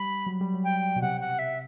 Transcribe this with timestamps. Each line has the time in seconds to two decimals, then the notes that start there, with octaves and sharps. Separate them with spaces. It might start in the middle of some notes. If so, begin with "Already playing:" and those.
Already playing: G3 B5
0.26 F#3
0.41 G3
0.54 F#3
0.64 G5
0.96 B2
1.02 C3 F#5
1.21 F#5
1.39 E5